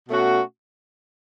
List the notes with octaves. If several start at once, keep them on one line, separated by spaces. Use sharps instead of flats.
B2 A3 C#4 F#4